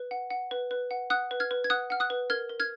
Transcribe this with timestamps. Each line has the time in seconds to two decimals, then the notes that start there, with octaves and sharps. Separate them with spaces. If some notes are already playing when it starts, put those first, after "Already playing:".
Already playing: B4
0.11 F#5
0.31 F#5
0.51 B4
0.71 B4
0.91 F#5
1.10 F#5 D#6 F#6
1.31 B4
1.40 F6 G#6
1.51 B4
1.64 G#6
1.70 F#5 D#6 F#6
1.90 F#5 F6
2.00 D#6 F#6
2.10 B4
2.30 A#4 F6 G#6
2.50 A#4
2.60 F6 G#6